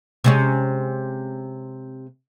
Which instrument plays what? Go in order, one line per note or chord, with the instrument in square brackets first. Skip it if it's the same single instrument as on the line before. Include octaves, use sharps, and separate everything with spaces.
[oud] C3 G#3 C#4